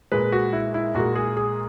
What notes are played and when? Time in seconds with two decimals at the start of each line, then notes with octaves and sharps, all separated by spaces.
0.12 A#2 G#3 B4
0.32 F#4
0.53 E4
0.74 E4
0.95 A#2 G#3 F#4
1.15 G#4
1.37 G#4